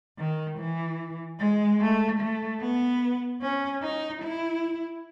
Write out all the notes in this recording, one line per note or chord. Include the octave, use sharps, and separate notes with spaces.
D#3
E3
G#3
A3
A3
B3
C#4
D#4
E4